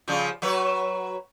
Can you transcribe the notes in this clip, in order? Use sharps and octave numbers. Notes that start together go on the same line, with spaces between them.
C#3 F3 G3
F#3 B4 C#5